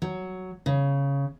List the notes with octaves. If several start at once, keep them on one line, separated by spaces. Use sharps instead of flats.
F#3
C#3